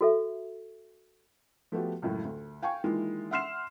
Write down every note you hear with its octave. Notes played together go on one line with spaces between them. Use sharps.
F#4 A4 E5
F3 A3 B3 F#4 G4
C#2 F#2 A2
D2
F5 G5 G#5 C#6
D#3 E3 G#3 A#3 E4 F4
E5 F#5 C6 F6 C7 E7